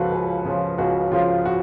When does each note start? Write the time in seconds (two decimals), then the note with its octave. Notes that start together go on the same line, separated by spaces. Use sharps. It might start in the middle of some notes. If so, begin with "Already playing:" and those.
Already playing: C#2 C#3 F3 F#4 A4 B4
0.12 C#2
0.45 C#3 F3
0.78 C#2 F#4
1.12 C#3 F3 F4
1.45 F#4